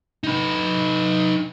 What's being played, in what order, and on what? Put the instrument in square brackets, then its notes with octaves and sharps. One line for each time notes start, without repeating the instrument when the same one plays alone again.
[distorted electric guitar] D#4 B4